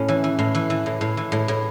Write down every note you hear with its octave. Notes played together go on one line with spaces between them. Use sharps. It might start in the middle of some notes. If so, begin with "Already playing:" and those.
Already playing: A2 C#4
E3
E3
A2
E3
E3
A2
A2
E3
A2
A2